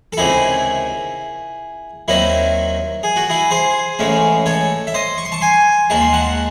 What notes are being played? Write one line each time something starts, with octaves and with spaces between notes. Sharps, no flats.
A4
C#2 C3 D#3 E4 G#4
D#2 D#3 F#3 C4 D#4 E4
G#4
F#4
E4 G#4
G#4 C5
A1 A2 G#3 C#4
A4 C#5
E5
C5 D#5
C#6
C6
A5 C#6
G#5 C6
D#2 D#3 G#3 A5
C6
F#5 A5